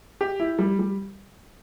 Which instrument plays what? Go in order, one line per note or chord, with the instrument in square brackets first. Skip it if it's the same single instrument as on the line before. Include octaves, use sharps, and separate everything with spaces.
[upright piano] G4
E4
G3
G3